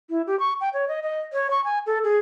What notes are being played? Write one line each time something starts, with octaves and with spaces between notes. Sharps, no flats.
E4
G4
C#6
G5
C#5
D#5
D#5
C#5
C#6
G#5
A4
G#4